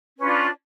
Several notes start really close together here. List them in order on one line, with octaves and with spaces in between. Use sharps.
C#4 B4 F4 D4